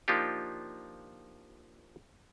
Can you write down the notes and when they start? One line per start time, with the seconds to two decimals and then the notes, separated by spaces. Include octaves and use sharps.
0.08 F3 A#3 D4 D#4 F4 G4